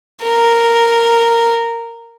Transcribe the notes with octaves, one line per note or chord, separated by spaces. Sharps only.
A#4